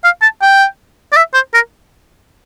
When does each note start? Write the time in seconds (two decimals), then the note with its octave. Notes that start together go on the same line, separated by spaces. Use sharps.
0.04 F5
0.22 A5
0.42 G5
1.12 D5
1.16 E5
1.34 C5
1.54 A#4